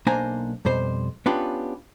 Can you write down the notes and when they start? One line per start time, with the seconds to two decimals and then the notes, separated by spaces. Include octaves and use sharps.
0.07 B1 A#3 D4 C5 G#5 A#5
0.65 F2 B2 G3 C5
1.26 B3 C#4 D4 F4 G4 B4